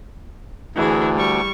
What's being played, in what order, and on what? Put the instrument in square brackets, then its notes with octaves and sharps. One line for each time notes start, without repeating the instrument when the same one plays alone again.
[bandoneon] D2 [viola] E3 G#4
[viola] G3 C#6